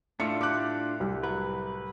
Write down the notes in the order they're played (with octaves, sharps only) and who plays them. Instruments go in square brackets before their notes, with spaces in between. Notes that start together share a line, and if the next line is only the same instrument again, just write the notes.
[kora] A2 A3 [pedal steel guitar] D4 F4 [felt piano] C#7
[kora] G4 [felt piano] D6 F#6
[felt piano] C2
[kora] F#3 [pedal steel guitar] B4